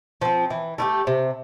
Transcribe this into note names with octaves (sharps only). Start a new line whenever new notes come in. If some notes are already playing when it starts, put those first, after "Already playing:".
F3 C4
E3
A3 E4 G4
C3